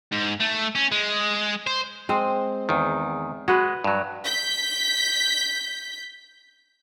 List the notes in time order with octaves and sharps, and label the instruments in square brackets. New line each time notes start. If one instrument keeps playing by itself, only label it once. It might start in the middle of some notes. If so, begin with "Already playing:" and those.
[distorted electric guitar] G#2
A3
C#4
G#3
C5
[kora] G#3 C4 C5
[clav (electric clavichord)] E2 D#3
[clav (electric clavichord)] G#3 [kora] F#4 B4
[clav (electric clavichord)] G2 F#3
[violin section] G6 B6